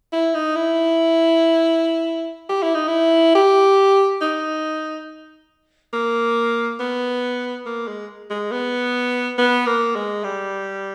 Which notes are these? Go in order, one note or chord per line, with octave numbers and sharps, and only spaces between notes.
E4
D#4
E4
G4
E4
D#4
E4
G4
D#4
A#3
B3
A#3
G#3
G#3
B3
B3
A#3
G#3
G3